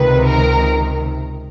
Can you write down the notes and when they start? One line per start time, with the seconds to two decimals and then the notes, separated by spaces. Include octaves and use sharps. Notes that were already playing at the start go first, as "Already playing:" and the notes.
Already playing: C#2 C3 D#3 B4
0.25 A#4